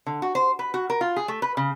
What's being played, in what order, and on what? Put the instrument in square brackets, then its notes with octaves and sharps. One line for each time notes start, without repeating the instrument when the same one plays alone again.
[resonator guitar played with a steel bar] D3
F#4
C5
B4
F#4
A#4
F4
G#4
A3
B4
C#3